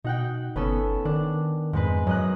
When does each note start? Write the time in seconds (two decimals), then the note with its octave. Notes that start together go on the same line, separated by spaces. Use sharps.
0.04 B2 D#4 F#5 G5
0.56 G1 B3 C#4 A4
1.05 D#3 D4
1.73 F2 G#2 G#3 B4
2.07 F#2 F#3 D#5 F#6